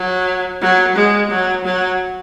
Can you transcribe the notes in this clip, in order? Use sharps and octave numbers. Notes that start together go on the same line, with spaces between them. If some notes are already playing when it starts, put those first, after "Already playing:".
Already playing: F#3
F#3
G#3
F#3
F#3